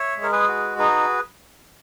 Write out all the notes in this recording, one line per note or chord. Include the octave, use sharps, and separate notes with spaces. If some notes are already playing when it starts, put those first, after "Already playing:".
Already playing: C#5 E5
G#3
A#4
G#4 B4
F#4
D#4 G#4 B4